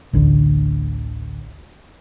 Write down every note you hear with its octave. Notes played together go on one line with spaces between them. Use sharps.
A1 D2 D3